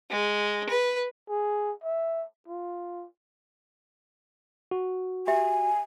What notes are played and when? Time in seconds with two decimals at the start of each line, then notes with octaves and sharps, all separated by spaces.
0.11 G#3
0.69 B4
1.29 G#4
1.84 E5
2.48 F4
4.71 F#4
5.27 G4 E5 G#5